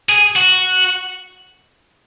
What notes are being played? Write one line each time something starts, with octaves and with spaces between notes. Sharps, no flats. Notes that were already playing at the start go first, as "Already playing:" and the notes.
G#4
F#4